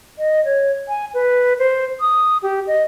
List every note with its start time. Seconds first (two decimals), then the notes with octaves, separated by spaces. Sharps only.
0.18 D#5
0.45 C#5
0.88 G#5
1.14 B4
1.59 C5
2.00 D#6
2.43 G4
2.67 D#5